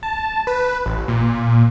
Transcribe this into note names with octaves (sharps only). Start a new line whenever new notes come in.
A5
B4
A1
A#2